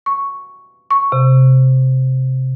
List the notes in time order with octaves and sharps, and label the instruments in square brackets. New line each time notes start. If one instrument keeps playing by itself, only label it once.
[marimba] C#6
C#6
C3